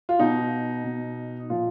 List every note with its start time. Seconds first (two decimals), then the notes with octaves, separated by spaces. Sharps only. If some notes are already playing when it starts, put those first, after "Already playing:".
0.09 F4
0.19 B2 D#4
0.84 B2
1.50 A#2 F3 F4